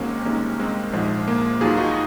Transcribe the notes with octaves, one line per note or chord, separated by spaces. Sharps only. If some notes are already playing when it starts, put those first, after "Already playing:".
Already playing: G#1 G#2 D#3 F#3 G#3 A#3 C4 C#4
C2 C3 D#3 G#3 A#3 C#4
G#3 C4
A#1 G#2 F3 G#3
A#3
D#2 D#3 F#3 F4 G#4
D#4 F#4